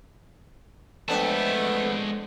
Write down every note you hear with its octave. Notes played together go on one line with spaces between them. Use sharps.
F2 G#3 A3 B3 D4 A5